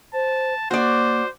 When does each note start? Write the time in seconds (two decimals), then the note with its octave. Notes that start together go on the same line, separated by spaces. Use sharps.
0.14 C5 A5
0.71 A#3 F#4 C5 D5